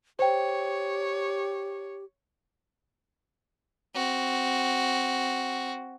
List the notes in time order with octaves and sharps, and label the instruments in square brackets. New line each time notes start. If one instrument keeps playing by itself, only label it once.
[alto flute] G4 [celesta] C5 G5 [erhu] C#5
[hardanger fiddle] C4 F#4